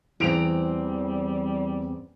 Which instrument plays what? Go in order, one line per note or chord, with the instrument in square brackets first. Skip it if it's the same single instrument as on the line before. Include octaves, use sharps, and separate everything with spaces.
[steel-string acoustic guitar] E2 C4 [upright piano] E3 D7 F7 [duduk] G3